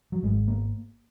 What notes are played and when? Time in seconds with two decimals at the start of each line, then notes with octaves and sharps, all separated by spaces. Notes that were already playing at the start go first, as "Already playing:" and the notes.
0.12 F#3
0.23 G#1 G#3
0.48 A#3